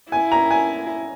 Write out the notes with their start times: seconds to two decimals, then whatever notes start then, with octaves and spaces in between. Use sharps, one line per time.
0.12 E4 G#5
0.32 A#5
0.51 G#5